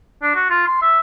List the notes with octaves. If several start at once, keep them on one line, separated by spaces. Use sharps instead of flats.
D4
F#4
F4
C6
E5